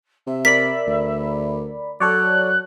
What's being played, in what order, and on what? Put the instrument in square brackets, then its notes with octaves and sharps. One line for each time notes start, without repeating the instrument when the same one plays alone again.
[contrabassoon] C3 [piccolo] E5
[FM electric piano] A#4 D5 B5 [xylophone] B6
[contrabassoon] D2
[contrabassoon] F#3 [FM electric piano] A4 C#5 D5 [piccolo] F#6